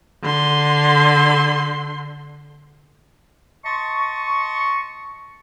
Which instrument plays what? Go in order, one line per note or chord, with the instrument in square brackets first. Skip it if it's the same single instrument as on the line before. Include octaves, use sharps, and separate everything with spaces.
[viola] D3 C6
[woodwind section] D#5 A5 C6 C#6